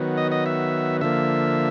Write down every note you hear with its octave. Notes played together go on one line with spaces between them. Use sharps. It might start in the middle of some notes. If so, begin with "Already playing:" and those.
Already playing: D#3 F#3 B3
D#5
D#5
E5
D3 F3 A#3 E5